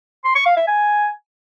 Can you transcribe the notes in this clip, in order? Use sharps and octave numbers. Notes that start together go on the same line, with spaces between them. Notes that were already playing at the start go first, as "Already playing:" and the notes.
C6
C#6
F5
E5
G#5